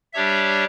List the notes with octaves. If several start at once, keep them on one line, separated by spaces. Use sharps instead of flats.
G3 D4 G4 C#5 E5